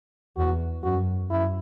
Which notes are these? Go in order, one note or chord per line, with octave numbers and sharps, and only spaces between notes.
E2 F#4
F#2 F#4
F#2 E4